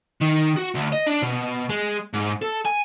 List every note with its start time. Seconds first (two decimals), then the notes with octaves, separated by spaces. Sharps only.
0.21 D#3
0.57 F#4
0.75 D2
0.93 D#5
1.07 D4
1.22 B2
1.69 G#3
2.14 G#2
2.42 A4
2.66 G#5